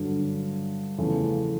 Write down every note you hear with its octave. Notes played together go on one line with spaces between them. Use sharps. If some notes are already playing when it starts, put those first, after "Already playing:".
Already playing: G2 D3 F#3
E2 C#3 F3 A3